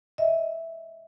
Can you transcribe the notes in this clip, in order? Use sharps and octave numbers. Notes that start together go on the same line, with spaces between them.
D#5 E5